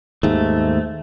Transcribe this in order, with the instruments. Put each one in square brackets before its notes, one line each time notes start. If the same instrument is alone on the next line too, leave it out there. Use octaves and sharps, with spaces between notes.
[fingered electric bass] D#2 G#2 [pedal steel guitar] A3